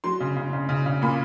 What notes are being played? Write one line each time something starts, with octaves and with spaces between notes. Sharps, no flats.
F#3 C6
C#3
C#3
C#3
C#3
C#3
A#2 B5